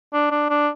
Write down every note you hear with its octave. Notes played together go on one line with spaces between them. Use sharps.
D4
D4
D4